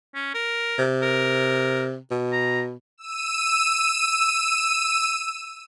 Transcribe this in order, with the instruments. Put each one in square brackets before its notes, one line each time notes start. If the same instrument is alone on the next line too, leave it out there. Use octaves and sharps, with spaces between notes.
[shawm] C#4
A#4
[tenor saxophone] C3
[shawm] A#4
[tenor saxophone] B2
[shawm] A#5
[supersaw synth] E6 D#7